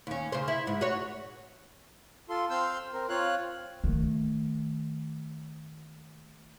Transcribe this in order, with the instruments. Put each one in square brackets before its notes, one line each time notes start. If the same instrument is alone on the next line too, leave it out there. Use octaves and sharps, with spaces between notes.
[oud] D#2 C#4
C#3 C5
E4
G#2
F#4 C#5
[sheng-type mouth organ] F4 A4 C6
C4 F5 C6 E6 G6
C4 A#4
C4 F4 C#5 F5 F#6
[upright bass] D#3 A3